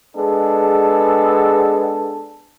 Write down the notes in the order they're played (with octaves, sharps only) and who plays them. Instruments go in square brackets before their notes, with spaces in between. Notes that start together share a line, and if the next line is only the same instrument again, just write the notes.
[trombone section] G#3 B3 D4 G#4 A4